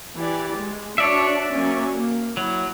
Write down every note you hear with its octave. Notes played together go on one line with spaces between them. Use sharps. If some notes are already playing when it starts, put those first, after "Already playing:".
E3 G4 D5
G#3
D4 F#4 C#5 D5 E5
F#3 A#3 C#4
A#3
F#3 E4